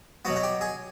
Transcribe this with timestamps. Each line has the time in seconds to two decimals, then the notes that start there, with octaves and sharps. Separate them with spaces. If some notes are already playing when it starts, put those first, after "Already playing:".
0.25 B2 F#3 B3 F#4
0.36 F#4
0.43 G4
0.61 G#4